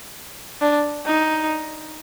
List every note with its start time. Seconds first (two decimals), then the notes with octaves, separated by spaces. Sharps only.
0.61 D4
1.07 D#4